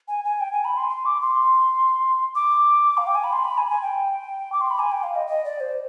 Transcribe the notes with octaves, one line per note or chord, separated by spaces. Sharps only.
G#5
G#5
G5
G#5
B5
C6
C6
D6
C6
D6
F5
G5
G#5
B5
C6
B5
G#5
B5
G#5
G5
D6
C6
B5
G#5
G5
F5
D#5
D#5
D5
C5